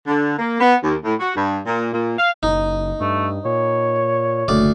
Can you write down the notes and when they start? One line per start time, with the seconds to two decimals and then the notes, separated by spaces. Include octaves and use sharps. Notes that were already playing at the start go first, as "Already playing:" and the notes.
0.07 D3
0.38 A#3
0.60 B3
0.82 D#2
1.04 A2
1.19 F#4
1.35 G2
1.66 A#2
1.92 A#2
2.18 F5
2.43 F#1 D#4
3.01 G2 A3
3.45 A#2 C#5
4.48 F#1 D2 D5